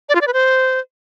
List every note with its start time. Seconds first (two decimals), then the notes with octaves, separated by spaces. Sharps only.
0.09 D5
0.15 F4
0.21 D5
0.27 B4
0.33 C5